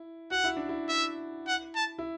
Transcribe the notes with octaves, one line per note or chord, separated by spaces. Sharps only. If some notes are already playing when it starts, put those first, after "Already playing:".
Already playing: E4
F#4 F#5
E4
D4
E4
E5
F#5
A5
E4